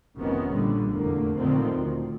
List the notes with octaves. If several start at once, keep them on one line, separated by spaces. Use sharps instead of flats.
F1 C3 D#3 B3 C#4
A#1 A#2 D3 G3
F1 E2 D3 A3 A#3
A#2 D3 D#3 F3 A3 C4
D2